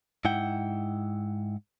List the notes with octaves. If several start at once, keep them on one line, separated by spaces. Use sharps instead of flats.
G#2 E4 F#5 G5